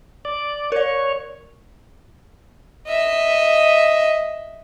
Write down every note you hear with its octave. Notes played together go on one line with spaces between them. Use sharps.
D5
A#4 C#5 D5
D#5 E5